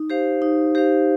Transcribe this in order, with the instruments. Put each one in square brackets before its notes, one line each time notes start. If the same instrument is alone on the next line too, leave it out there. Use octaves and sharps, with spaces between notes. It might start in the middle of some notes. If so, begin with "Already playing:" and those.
Already playing: [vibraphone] D#4
G4 C5 F5
D#4
G4 C5 F5